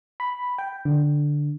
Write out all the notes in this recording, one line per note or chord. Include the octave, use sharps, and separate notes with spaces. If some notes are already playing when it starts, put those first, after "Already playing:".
B5
G5
D3